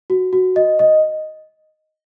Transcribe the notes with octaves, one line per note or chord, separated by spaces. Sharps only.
F#4
F#4
D#5
D#5